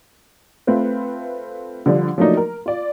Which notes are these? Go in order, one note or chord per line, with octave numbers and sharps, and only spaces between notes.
A3 C4 F4 B4
D3 F3 G3
F3 F#3 A3 A#3 D4 D#4
A#4
F4 D5